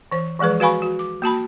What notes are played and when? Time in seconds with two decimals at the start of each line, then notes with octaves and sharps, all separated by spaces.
0.12 E3 C5
0.39 E3 F3 G#3 G#4 B4
0.60 F#4 B4 F5 G#5 B5 C#6
0.82 F#4
0.99 D6
1.22 A#3 F#4 A5 B5